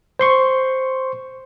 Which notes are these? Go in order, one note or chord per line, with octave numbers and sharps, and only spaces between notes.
C5 C6 C#6